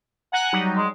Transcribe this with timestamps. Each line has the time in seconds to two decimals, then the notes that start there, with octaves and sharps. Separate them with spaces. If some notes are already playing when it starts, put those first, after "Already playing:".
0.33 F#5 G#5 A#5 F#6
0.53 F#3 G3 D#4
0.77 G#3